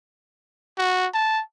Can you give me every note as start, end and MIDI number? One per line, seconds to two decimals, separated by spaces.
0.78 1.07 66
1.14 1.42 81